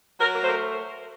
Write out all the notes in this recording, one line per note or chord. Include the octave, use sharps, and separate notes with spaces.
F#3 A#4
A#4
A3 C5
A#4